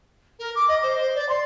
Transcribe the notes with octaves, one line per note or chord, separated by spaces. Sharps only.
A#4
D6
D#5
C5
C5
D5
C6